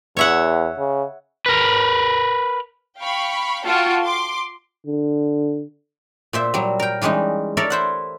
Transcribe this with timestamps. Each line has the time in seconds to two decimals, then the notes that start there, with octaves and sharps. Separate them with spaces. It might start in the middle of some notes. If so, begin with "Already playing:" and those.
0.17 E2 C#5 E5 F#5
0.78 C#3
1.46 A#4 B4
2.99 F5 G5 B5 C#6
3.66 F4 F#4 A4 G5 A5
4.04 C6 D6
4.87 D3
6.33 A#2 C5 E5
6.54 F#3 G3
6.80 A#4 G5
7.02 E3 G3 G#3 C#4 D#4
7.57 A4 A#4 C#5 D5 E5
7.70 E4 C5 F#5